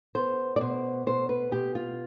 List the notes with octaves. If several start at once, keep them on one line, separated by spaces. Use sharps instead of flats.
B3 C5
D5
B2 C5
B2 C5
B4
B2 G4
F4